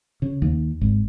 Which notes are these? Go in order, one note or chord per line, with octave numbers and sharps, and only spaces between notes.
C#3
D#2
G#1